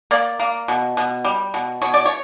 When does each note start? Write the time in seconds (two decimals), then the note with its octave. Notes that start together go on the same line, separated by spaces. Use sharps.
0.11 A#3 D5
0.40 A#3
0.68 B2
0.97 B2
1.25 G3
1.54 B2
1.82 B2 C#5
1.94 D5
2.06 C#5